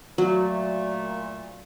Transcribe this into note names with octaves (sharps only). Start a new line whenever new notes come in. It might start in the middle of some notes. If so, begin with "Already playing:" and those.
A#2 F#3 A3